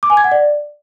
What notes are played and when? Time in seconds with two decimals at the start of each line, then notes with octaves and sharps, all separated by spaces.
0.03 D6
0.10 G#5
0.17 G#6
0.24 F#5
0.32 D5